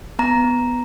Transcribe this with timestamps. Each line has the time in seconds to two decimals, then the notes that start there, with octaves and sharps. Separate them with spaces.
0.19 B3 A#5
0.44 B3